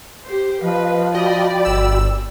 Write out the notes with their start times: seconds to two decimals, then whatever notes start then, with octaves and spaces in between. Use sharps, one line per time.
0.24 G4 C5
0.61 F3 B4 D#5 F5
1.15 F#4 D5 D#5 G5 B5
1.65 G1 E6